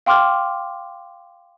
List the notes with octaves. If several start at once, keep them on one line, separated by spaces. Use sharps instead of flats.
F5 G5 C6 D6 F6